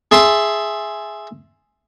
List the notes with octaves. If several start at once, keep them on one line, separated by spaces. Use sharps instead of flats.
G#4 E5 A5 C6